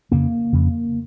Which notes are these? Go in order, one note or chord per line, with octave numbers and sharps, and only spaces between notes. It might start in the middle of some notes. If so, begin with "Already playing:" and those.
F2 C#3 A#3
F2 C#3